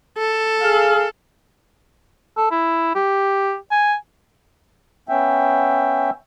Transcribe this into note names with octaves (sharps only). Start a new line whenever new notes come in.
A4
G#4 F5
A4
E4
G4
G#5
B3 C#4 E5 G5